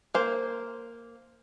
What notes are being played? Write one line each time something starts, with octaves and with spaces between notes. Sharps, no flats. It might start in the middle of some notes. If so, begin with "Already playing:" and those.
A#3 C5